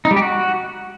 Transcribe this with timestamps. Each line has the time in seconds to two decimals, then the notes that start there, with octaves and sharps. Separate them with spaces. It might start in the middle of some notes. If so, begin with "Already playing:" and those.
0.05 D#4
0.11 G3
0.16 G4
0.22 F#4